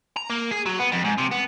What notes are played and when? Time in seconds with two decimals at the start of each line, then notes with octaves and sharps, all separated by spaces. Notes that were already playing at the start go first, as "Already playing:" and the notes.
0.16 A#5
0.30 A#3
0.51 G#4
0.66 F#3
0.79 B3
0.92 F2
1.04 G#2
1.18 C3
1.31 B3